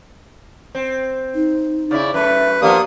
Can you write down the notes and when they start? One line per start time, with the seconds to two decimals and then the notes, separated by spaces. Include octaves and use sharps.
0.75 C4
1.35 D#4
1.91 C#3 E4 D5
2.14 F#2 A3 B4 E5
2.62 F3 A#3 B3 D4 G4 D#6